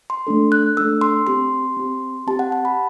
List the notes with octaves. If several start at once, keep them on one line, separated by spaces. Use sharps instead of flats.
C6
A3 D4 A4
F#6
A3 D4 A4 E6
C6
C4 G4 C6
C4 G4
C4 G4 A5
F#5
A5
B5